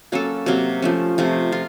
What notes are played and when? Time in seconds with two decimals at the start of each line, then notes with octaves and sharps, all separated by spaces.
0.12 F#3 A#3 C#4 A4
0.46 C3 F#3 A#3
0.82 F3 A3 C#4
1.18 C3 F3 A3
1.52 F4